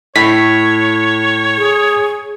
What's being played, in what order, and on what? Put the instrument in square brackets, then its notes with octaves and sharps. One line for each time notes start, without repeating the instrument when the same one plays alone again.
[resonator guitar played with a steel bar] A2 [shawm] C#5 [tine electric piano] B6
[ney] G#4